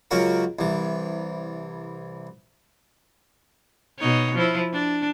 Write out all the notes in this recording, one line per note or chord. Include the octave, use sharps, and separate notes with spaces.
C#2 F#3 C#4 F#4 A#4
C2 E3
B2 D#4 C#5
F3 E4
D4